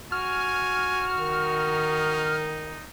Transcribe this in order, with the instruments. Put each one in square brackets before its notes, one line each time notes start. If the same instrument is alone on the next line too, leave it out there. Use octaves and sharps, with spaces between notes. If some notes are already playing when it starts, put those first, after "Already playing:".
[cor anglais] F#4 [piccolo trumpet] G#5 [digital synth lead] F6
[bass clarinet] D#3 [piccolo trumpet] D#4